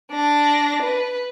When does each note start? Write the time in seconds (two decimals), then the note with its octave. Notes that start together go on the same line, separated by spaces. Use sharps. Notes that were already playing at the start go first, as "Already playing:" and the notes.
0.12 D4 A#6
0.82 B4